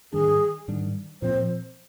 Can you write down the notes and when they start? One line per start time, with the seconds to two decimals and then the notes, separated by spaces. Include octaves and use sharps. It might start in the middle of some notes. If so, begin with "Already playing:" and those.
0.12 G#2 D#3 G3 D4 G#4
0.68 G#2 D#3 G3 D4
1.22 A#2 F3 C4 C5